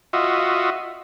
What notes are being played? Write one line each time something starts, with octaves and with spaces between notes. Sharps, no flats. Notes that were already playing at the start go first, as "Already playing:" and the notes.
F4 F#4 D#5 E5